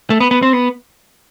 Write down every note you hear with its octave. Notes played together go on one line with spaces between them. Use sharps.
A3
B3
B3
C4
B3